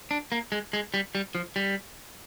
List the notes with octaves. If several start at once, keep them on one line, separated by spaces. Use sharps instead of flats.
D4
A#3
G#3
G#3
G3
G3
F3
G3